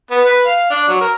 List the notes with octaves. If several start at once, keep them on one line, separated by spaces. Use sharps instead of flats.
B3
B4
F5
D4
F#3
A#4